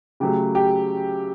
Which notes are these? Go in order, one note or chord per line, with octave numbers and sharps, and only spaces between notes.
C#3 F#3 A3 G4
G4